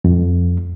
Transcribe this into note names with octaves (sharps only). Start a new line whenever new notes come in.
F2